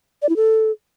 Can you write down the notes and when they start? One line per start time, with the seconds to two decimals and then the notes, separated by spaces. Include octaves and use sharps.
0.22 D5
0.29 E4
0.36 A4